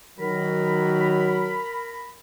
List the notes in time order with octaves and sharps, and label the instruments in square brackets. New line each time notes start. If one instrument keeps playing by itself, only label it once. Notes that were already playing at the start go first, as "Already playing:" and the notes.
[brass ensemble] D#3 F#3 [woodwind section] A#4 B5